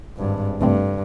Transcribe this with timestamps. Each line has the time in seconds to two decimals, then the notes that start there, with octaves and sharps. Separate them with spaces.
0.17 G#1 G2
0.61 C#2 G2 A3 C4